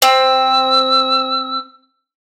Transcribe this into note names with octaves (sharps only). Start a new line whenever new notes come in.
C4 E6